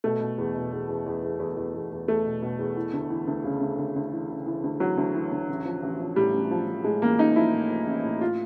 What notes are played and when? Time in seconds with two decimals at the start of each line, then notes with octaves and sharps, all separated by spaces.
0.04 B2 A3
0.21 B2
0.38 E2
0.55 B2
0.72 E2
0.89 E2
1.06 E2
1.23 E2
1.39 E2
1.57 E2
1.74 E2
1.91 E2
2.08 E2 A3
2.25 B2
2.42 B2
2.59 E2
2.76 E3
2.93 D2
3.10 E3
3.27 D2
3.44 C#3
3.61 D2
3.78 D2
3.96 D2
4.12 E3
4.29 C#3
4.46 E3
4.64 D2
4.80 E3 F#3
4.97 D2
5.15 E3
5.32 D2
5.48 A1
5.65 F3
5.83 A1
6.00 F3
6.16 A2 G3
6.34 A1
6.51 F3
6.68 F3
6.84 A2 G#3
7.02 A1 A#3
7.19 A1 D#4
7.36 F3 E4
7.52 A2
7.70 F3
7.87 A1
8.04 A2
8.21 F4